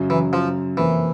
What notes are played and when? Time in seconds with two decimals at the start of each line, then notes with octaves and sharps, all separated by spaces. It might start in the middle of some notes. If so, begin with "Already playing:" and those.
Already playing: F#2 C#3 F#3
0.10 E3
0.33 F3
0.77 F2 C3 E3 F3 A#3